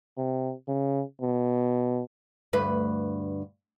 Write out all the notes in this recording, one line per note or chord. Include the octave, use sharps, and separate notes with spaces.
C3
C#3
B2
D2 G2 B4